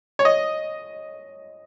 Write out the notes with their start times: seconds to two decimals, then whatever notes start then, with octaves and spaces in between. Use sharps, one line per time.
0.19 C#5
0.25 D#5